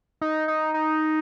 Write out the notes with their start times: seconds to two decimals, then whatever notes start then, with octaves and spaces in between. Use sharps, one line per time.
0.21 D#4
0.48 D#4
0.74 D#4